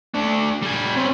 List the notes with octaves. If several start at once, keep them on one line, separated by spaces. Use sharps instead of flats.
A3 D4
G3 G#5
C4 C#4